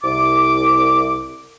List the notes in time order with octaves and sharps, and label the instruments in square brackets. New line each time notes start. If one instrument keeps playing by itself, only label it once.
[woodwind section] C2 D6